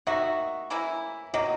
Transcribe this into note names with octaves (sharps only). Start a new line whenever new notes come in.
D#3 A#3 D#4 F#4 E5
C#3 E3 A#3 E4
D#3 F#3 A#3 D#5